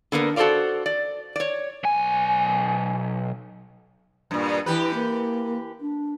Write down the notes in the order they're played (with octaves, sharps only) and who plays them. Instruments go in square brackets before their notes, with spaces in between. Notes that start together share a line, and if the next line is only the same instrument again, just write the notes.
[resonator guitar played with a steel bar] D3 A#3 B3 A#4
F#4 A4 A#4 C5 D5 F5
D5
C#5 D5
[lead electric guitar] B1 G#5
[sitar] G2 A#2
[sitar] E3 G4 B4 [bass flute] E4
[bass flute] A#3
D4